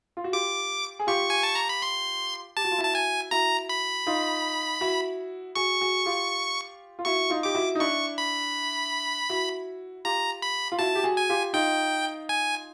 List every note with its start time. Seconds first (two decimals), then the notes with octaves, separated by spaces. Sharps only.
0.17 F4
0.24 F#4
0.33 F4 G4 D6
0.99 G#4
1.07 F4 G4 C#6
1.30 G#5
1.43 A5
1.55 A#5
1.69 B5
1.82 C6
2.57 G4 A5
2.64 F#4
2.71 F4
2.78 E4 F#4
2.84 A5
2.95 G#5
3.31 E4 F#4 A#5
3.69 B5
4.06 D#4 F4
4.81 E4 F#4
5.55 F#4 G#4 C#6
5.81 F#4 G#4
6.06 F4 G4
6.99 F4
7.05 E4 F#4 C#6
7.30 D#4 F4
7.43 G4 D6
7.55 E4 F#4
7.75 D#4
7.80 D4 E4 C#6
8.18 B5
9.29 E4 F#4
10.05 F4 G4 A#5
10.42 B5
10.72 F4
10.79 E4 F#4 A5
10.95 G4
11.04 F#4 G#4
11.17 G#5
11.29 F4 G4
11.53 D#4 F4 G5
12.29 G#5